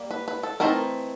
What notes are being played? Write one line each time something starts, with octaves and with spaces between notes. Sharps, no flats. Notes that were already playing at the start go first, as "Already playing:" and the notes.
Already playing: G3 A#3
B4
B4
A4
E3 A3 C4 D#4 A#4